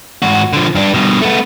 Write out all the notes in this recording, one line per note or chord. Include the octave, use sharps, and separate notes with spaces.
G#2 F#4
D3 F3
G2 D4
G2 B2
A3 B3